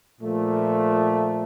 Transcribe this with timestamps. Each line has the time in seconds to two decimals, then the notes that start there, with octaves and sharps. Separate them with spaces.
0.21 A#2 F3 A3